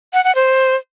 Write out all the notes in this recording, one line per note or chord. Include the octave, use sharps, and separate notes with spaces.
F#5
F#5
C5